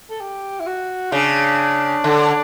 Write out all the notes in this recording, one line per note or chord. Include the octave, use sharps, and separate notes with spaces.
A4
G4
E4
F#4
C#3 D4
D3